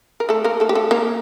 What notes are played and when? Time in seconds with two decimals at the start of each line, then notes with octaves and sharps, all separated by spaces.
0.20 A#4
0.29 A3 A4
0.44 A#3 A#4
0.60 A3 A4
0.69 G4
0.75 A3 A4
0.91 A#3 A#4